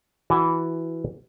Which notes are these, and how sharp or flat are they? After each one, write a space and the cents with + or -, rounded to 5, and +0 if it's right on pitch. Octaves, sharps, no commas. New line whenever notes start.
E3 +0 F#4 +0 A5 -10